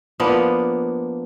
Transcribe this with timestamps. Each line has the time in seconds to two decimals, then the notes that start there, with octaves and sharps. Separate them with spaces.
0.20 F3 A#3 B3 D4